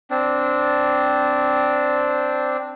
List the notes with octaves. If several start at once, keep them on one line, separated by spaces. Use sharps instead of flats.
C4 D4